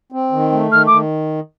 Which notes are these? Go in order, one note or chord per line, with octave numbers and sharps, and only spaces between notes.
C4
D#3
A3
D#3 F6
D#3 D6